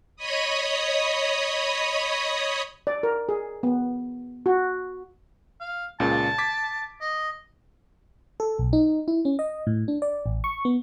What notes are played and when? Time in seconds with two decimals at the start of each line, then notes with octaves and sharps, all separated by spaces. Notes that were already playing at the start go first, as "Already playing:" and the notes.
0.16 C#5 D#5 B5 D#6
2.87 D5
3.03 A#4
3.29 G#4
3.63 B3
4.46 F#4
5.60 F5
6.00 C#2 A#2 C#3 A5
6.38 D6 G#6 B6
7.01 D#5
8.40 A4
8.58 B1
8.73 D#4
9.08 E4
9.25 C#4
9.39 D#5
9.67 A2
9.88 D4
10.02 D5
10.26 A1
10.44 C#6
10.65 B3